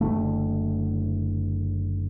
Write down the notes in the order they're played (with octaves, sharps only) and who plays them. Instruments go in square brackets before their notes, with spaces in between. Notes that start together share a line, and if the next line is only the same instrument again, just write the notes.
[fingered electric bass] F#1 D3 A3